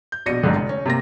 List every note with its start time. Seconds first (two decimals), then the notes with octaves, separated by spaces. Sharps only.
0.12 G6
0.26 A#1 B2 A#6 C#7 D#7
0.43 A1 G#2 D3
0.56 F1
0.69 C#4
0.86 C3 A#3 A#6